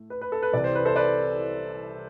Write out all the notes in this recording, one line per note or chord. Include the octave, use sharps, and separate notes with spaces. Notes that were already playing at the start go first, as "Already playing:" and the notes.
Already playing: A2 A3
B4
B4
A4
B4
C2 C3 E3 D5
C5
B4
A4 C5
B4 D5